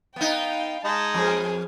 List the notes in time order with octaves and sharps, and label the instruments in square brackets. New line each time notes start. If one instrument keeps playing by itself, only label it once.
[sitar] B3 D#4 [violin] F5 G5
[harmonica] G#3 D#4 [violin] A5
[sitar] F2 [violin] G#4 C5